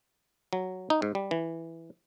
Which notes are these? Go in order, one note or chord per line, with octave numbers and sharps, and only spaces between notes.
F#3
D#4
G#2
G3
E3